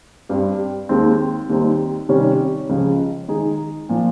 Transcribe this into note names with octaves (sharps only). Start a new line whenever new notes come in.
G2 G3 C4
D#2 D#3 G#3 C4
D#2 D#3 G3 C4 D#4
C3 D#3 G3 C#4
C#2 C#3 F3
D#3 G#3 D#4 G#4
A#2 F3